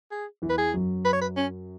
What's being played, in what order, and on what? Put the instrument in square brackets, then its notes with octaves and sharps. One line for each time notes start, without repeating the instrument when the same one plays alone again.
[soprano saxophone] G#4
[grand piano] E2 E3
[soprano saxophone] B4
G#4
[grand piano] F#2 F#3
[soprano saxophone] B4
C#5
B4
C#4